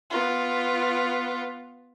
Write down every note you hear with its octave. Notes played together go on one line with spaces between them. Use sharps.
B3 F4